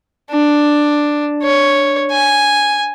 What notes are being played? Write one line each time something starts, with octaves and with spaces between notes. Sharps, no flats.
D4
C#5
G#5